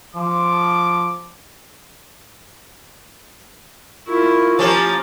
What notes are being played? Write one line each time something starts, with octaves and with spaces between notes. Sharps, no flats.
F3 D6
E4 F4 A#4 C#6
F3 C#4 G4 A#5 D6